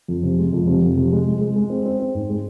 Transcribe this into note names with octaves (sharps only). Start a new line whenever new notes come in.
F2
C3
G#3
F2
C3
F2
C3
G#3
G#3
G#3
G#3
C4
C4
C4
G#2
G#3